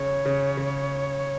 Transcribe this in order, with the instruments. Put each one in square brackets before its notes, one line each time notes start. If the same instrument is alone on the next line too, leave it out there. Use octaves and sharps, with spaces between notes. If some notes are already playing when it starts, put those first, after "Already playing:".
Already playing: [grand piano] C#3 [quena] C#5
[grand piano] C#3
C#3